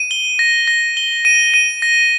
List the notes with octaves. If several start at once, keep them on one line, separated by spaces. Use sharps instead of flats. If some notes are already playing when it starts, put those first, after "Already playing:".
Already playing: D#7
G7
A#6
A#6
G7
D#7
D#7
A#6